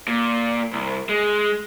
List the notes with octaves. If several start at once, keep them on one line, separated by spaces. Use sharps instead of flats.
A#2
C2
G#3